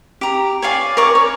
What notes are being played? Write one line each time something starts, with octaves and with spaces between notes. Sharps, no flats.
G4 A#5
C#5 D5 F5 G#5
A#4 D5 C#6 D6
C#5